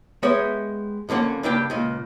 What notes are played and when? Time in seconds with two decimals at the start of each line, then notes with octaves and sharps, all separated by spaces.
0.23 G#3 B3 G4 C#5 E5
1.09 F2 D3 A#3 C#4 F#5
1.43 G2 C#3 A#3 G4 G5
1.70 C#2 A#2